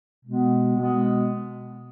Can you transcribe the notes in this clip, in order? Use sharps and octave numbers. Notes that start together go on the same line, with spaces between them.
B2 G#3 B3
B2 G#3 B3